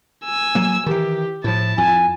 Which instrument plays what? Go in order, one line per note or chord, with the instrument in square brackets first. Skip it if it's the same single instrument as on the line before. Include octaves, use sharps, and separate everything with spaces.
[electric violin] G#5 E6
[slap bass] F#3 A#3
[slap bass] D#3 E3 [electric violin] G4
[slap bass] A2 F3 [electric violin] E4 A5
[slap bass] F2 [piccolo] G#5